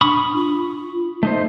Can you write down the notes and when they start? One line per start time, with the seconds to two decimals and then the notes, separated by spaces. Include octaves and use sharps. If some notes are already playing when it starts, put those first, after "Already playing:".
0.01 D4 B5 C#6 D#6
0.36 F4
1.23 A3 D#4 C5